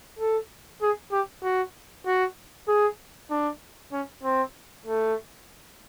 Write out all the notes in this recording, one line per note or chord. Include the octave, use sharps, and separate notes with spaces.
A4
G#4
G4
F#4
F#4
G#4
D4
C#4
C4
A3